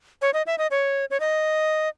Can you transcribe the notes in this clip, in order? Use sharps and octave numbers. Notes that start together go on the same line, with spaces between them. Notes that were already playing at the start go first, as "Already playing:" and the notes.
C#5
D#5
E5
D#5
C#5
C#5
D#5